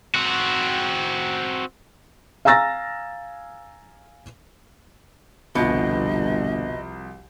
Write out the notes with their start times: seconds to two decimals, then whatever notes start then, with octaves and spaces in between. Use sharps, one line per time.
0.14 C4 F#4
2.45 F5 G#5 A#5 E6 A6 A#6
5.55 G1 C2 B2 F3 D#5